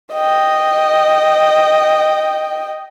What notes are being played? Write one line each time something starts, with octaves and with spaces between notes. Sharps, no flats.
D#5 G5